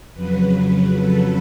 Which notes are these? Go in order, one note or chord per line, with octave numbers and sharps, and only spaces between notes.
F2 C#3 F#3 B4
A4